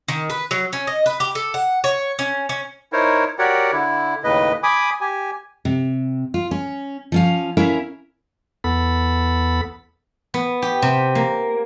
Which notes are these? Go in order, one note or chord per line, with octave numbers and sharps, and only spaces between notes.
D#3
B4
F#3
C#4
D#5
B4
G4
A4
F#5
C#5
C#4
C#4
D#4 E4 A#4 C5 C#5
F#4 G4 A#4 C#5 D5 F#5
D3 E4
D#2 A2 C#3 B4 D#5
G#5 B5 D6 D#6
G4 G#5
C3
F4
C#4
F3 C#4 F5
C#4 E4 A#4 E5 F5
E2 B3 A4 B5
B3
G4
C3
A#3